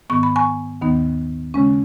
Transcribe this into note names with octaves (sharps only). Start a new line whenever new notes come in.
G#2 D#3 B3 C#6
B5
G#5 C#6
D#2 D#3 B3 D#4
C#3 G#3 C#4